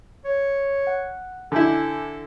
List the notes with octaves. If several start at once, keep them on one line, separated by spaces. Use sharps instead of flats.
C#5
F#5
D3 E4 A4 G#5 D6 G6